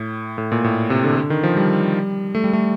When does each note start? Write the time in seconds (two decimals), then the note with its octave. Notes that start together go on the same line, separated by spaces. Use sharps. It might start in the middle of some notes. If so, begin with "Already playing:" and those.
Already playing: A2
0.38 A2
0.52 A#2
0.64 A2
0.90 C3
1.04 D3
1.17 D3
1.30 D#3
1.43 F3
1.57 G3
2.35 A3
2.44 G3
2.53 A3